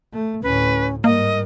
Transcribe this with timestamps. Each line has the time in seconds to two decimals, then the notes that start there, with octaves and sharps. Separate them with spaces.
0.14 A3
0.43 D2 A2 C#4 B4
1.04 G#2 G3 A#3 A#4 D#5